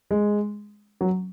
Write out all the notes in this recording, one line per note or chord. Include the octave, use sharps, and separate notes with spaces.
G#3
F#3